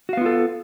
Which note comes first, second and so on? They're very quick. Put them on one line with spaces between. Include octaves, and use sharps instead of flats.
F#4 F5 B3 F4 A4